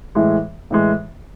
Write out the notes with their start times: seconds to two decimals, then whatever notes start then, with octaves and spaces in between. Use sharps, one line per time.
0.15 A2 E3 G#3
0.70 A2 E3 G#3